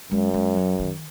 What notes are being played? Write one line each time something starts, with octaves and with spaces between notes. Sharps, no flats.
F#2 G#3
G#3
F#3
D#3